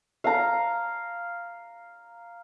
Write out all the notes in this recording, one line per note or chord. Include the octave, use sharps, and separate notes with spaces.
F5 A#5